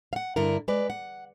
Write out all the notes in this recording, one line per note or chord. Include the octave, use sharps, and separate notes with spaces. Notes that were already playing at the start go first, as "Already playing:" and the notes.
F5 F#5
G2 D3 E4 A#4
G#3 B4 D5
F#5